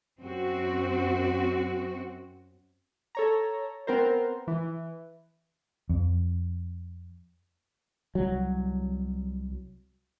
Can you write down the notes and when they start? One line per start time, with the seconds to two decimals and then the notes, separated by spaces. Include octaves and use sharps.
0.19 F#2 C4 F#4
3.15 A4 C#5 A#5
3.87 B3 C4 A#4 C5
4.47 E3
5.89 F2
8.15 C2 F#3